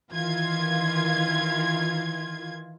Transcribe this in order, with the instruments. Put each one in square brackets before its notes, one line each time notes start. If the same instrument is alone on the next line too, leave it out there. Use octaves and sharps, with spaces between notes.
[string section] D#3 E3 F4 G#6